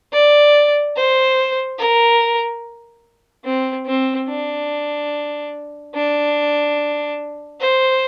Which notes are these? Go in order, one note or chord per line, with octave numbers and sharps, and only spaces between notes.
D5
C5
A#4
C4
C4
D4
D4
C5